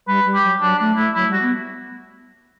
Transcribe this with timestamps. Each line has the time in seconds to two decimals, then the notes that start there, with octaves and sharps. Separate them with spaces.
0.07 G3 B4
0.25 G3
0.34 G4
0.43 F#3
0.61 F#3 D4
0.78 A3 D4
0.97 A3 E4
1.15 F#3 E4
1.28 G3
1.33 F#4
1.42 B3